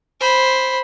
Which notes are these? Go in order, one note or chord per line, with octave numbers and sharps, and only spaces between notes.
C5 B5